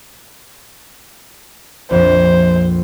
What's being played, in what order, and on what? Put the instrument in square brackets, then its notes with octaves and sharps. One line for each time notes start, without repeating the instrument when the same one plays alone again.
[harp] A#1 F2 F3 [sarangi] C5